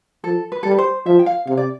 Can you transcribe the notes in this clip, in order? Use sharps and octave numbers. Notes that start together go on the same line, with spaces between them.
F3 A4
B4
G3 A4
B4
C5
F3 E5
G5
F5
C3 F5
D5